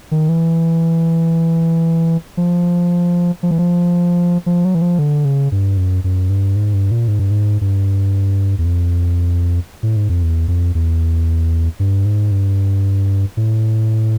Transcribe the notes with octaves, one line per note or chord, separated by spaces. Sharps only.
D#3
E3
F3
F3
E3
F3
F3
F#3
E3
F3
D3
C#3
G2
F#2
F#2
G2
G#2
G2
A#2
G#2
G2
G#2
G2
E2
F2
A2
G#2
F2
E2
F2
E2
G2
G#2
G2
A2